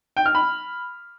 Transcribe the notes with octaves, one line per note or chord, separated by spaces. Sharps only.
G5
F6
B5